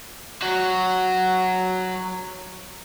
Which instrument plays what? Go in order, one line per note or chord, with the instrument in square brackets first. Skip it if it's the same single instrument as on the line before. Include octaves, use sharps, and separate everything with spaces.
[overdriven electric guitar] F#3 F#4